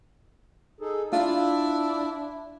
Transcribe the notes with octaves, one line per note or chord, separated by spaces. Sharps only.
D#4 G#4 A4
D4 E4 F4 E5